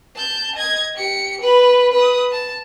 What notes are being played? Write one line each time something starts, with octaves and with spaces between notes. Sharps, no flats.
A5 G6
D#5 G#6
G4 C#7
B4 B5
B4 D#6
A5